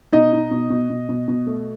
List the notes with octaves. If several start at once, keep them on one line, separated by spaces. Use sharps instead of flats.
B2 D#4 D#5
D#4
B2
B2
B2
B2
B2
A3